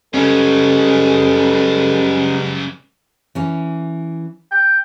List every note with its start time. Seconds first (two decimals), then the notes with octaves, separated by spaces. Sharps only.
0.14 F#2 C#3 G3 G#3 B3 C#4 A4
3.35 E3 C#4
4.52 G5